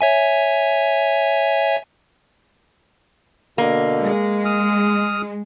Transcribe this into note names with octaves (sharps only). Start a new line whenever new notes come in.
C#5 E5 G#5
B2 D3 A#3
G#3
D#6 F6